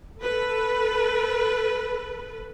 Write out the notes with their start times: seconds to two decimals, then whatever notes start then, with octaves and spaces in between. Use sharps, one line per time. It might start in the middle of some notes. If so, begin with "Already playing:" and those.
0.23 A4 B4